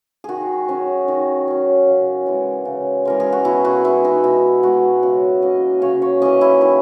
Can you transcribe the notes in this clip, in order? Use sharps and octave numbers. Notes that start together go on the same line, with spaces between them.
D#3 F#4 G#4
F#3 C#4
D#3
F#3 C#4
C#3
E3 G#3
C#3
E3 G#3 A#4
G#4
F#4
B2 E4
F#4
G#3 B3 E4
D#4
B2 E4
G#3 B3 F#4
C#3 F#4
E3 A#3 C#4 D#5
C#3 C#5
C#5
E3 A#3 C#4 D#5
E4
D#3 E4